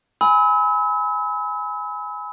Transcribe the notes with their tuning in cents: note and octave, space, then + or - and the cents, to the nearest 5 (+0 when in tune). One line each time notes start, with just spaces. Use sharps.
G#5 +0 B5 +15 E6 -40